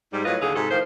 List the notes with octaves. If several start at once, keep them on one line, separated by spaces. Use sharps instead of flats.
G#2 G3
A2 F#3 F4 B4 D#5
D#2 D3 G#4 F5 F#5
G#2 C3 G#3 F#4 A4
A2 D#3 F3 C5